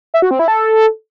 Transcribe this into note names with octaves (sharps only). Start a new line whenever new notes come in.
E5
F#4
C4
E4
A4